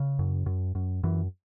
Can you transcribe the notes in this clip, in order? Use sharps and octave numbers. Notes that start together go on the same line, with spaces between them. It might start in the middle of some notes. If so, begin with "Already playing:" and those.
Already playing: C#3
F#2
F#2
F#2
F#2 E3